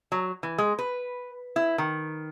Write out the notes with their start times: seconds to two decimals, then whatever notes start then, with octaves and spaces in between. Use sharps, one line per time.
0.12 F#3
0.43 E3
0.58 G#3
0.79 B4
1.56 E4
1.78 D#3